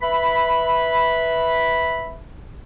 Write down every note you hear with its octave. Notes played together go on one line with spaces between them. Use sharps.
B4 E5 B5